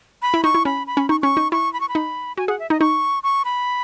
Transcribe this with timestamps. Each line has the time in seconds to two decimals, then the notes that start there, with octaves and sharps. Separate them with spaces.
0.22 B5
0.34 E4
0.44 D#4 C#6
0.54 E4
0.65 C#4 B5
0.87 B5
0.97 C#4
1.09 D#4 C#6
1.22 C#4 C#6
1.37 D#4
1.52 E4 C#6
1.73 B5
1.81 C#6
1.89 B5
1.95 D#4
2.37 F#4 G#5
2.48 G#4 F#5
2.59 E5
2.70 D#4 D#5
2.80 D#4 C#6
3.23 C#6
3.45 B5